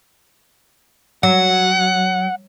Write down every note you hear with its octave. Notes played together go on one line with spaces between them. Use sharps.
F#3 F#5